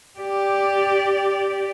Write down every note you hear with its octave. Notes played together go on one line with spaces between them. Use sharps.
G4 D5